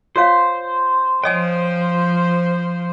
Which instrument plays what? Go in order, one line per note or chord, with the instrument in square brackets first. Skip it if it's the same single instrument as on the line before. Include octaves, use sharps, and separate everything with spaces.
[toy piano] F4 C#5 F5 [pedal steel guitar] C5
[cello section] F3 C5 [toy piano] C#5 D#5 G#5 [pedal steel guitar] G5 D#6